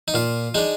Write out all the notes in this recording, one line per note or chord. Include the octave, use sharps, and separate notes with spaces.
D#4
A#2 F4
G#3 D4 D#4